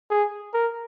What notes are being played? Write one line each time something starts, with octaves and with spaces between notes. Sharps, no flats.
G#4
A#4